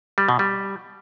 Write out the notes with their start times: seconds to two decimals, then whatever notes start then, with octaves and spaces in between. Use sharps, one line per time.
0.18 G3
0.28 B2
0.39 G3